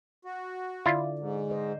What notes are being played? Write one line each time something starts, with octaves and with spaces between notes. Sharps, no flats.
F#4
D3 E4 F4 D5
G#2
C5 D#5